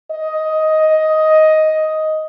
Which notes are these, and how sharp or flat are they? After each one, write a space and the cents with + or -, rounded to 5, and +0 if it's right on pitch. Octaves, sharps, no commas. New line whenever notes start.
D#5 +10